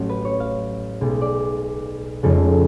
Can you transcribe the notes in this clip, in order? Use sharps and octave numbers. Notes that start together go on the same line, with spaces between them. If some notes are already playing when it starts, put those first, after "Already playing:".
Already playing: A1 A2 F#3 A3
B4
C#5
F5
B1 B2 G#3
D5
F1 F2 C#3 G#3 A4